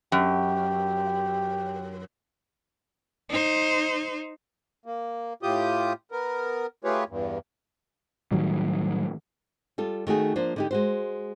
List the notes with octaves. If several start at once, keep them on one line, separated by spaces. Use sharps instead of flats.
F#2 G4
D#4 C5
A#3
A2 F4 G4 D#6 G6
B3 A#4
A3 F4 G4 G#4 B4 C#5
E2 G2
A2 D#3 F#3 G3
G3 F4 A4
D#3 A3 F#4 G#4
F3 A#3 D4 C5
D3 D#4 G4
G#3 F#4 C5